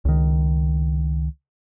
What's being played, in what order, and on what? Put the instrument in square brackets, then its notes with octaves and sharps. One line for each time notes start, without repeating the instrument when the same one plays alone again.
[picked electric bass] C#2 D#3